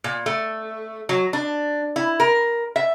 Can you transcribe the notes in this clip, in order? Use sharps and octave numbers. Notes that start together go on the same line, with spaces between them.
A#2
A3
F#3
D4
E4
A#4
E5